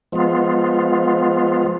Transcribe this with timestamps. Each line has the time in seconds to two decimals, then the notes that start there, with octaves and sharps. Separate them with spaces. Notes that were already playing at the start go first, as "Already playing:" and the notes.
0.12 F3 G#3 B3 F4